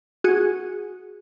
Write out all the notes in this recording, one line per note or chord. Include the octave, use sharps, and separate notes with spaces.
F#4 G#4